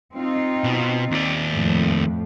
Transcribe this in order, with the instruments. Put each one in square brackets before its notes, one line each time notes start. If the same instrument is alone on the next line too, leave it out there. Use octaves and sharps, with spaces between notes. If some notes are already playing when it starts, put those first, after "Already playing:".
[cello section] C4 D#4 F4
[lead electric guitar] B2
D#2 D5
[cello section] F2 A2 F3